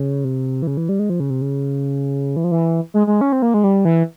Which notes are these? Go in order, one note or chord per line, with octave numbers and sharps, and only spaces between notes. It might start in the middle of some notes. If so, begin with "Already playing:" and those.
Already playing: C#3
C3
E3
C#3
E3
G3
G#3
F3
C#3
C3
C#3
E3
F3
E3
G#3
G#3
C#4
C4
A#3
G#3
G3
E3